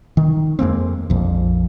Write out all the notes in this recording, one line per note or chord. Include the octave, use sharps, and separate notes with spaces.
D#3
F2 G#3 A#3 C4
A#1 F2